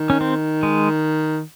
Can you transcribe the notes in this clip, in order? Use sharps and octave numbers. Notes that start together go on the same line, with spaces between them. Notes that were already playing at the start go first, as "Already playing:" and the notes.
Already playing: D#3
C#4
C4
G#3